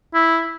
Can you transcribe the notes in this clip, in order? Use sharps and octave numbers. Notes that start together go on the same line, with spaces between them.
E4